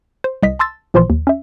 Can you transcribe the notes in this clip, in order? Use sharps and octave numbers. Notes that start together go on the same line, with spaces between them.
C5
C2 D#5 B6
A5 C6 E6 A6
A1 A#2 E3 F3 C5 C6
D#2
C#4 E5